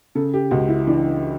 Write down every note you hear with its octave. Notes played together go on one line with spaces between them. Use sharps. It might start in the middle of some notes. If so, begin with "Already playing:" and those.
C#3 A4
G4
C#2 F#4
E4
E3 D4